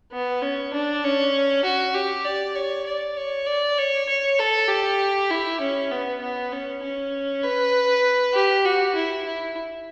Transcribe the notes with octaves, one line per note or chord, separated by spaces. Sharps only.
B3
C#4
D4
C#4
F#4
G4
D5
C#5
D5
C#5
D5
C#5
C#5
A4
G4
E4
C#4
B3
B3
C#4
C#4
B4
G4
F#4
E4
E4